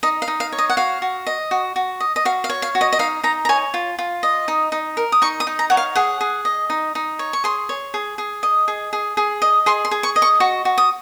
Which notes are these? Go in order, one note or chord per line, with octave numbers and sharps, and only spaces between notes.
D#4 D#5
F5
D#4
F5
C#5
D#5
F#5
F#4 F5
F#4
D#5
F#4
F#4
D#5
D#5
F#4 F5
F5
C#5
F5
F#4
D#5
D#5
D#4 F5
D#4 A#5
A#5
C#5 G#5
F4
F4
D#5
D#4
D#4
A#4
D#6
D#4 C#6
D#6
D#4
A#5
C#5 F#5
F5
G#4 F#5
G#4
D#5
D#4
D#4
C#5
C#6
G#4 C6
C#5
G#4
G#4
D#5
G#4
G#4
G#4
D#5
G#4 C6
C6
G#4
C#6
D#5
C#6
F#4 C#6
F#4
D#6